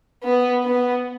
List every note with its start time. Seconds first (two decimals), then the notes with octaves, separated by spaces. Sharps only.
0.23 B3
0.64 B3